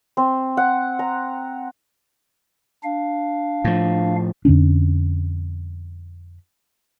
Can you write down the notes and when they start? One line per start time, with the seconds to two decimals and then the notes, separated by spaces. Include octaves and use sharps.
0.17 C4
0.57 F#5
0.99 A#5
2.83 D4 F5
3.64 A2 F3
4.45 F2 D3 C#4 D4